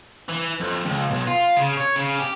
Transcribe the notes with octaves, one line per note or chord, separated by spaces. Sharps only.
E3
F2
C#2
B1
F4
C#3
C#5
C#3
G4